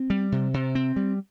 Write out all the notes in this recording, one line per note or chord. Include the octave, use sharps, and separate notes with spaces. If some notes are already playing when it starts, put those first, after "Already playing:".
Already playing: C4
G3
C3
C3
C4
G3